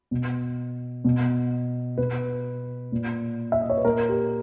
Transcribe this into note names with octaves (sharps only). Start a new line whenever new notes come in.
B2
B2
B2 B4
A#2
E5
D#5
C#5
B4
A#2 A#4
G4